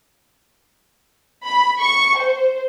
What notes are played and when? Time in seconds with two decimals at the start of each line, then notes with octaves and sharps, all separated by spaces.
1.46 B5
1.80 C#6
2.18 C5